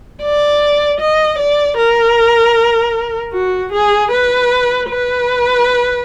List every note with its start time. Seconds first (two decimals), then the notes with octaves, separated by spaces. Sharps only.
0.22 D5
1.00 D#5
1.39 D5
1.77 A#4
3.33 F#4
3.73 G#4
4.11 B4
4.89 B4